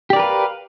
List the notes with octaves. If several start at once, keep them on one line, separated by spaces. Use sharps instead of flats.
G4 A#4 B4 D5 F5